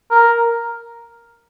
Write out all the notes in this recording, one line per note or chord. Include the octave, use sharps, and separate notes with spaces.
A#4